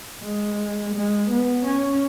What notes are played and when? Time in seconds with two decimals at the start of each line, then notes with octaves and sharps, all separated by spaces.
0.22 G#3
0.94 G#3
1.30 B3
1.65 C#4